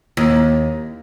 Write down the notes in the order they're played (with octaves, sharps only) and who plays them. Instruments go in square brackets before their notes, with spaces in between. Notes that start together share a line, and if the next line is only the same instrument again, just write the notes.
[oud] D#2